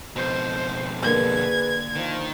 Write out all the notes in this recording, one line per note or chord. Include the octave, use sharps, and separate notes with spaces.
F2 B2 C5
D3 A#3 G#4 B4 G#6
D#3 F3